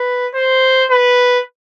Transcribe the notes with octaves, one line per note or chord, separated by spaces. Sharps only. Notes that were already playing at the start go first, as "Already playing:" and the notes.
Already playing: B4
C5
B4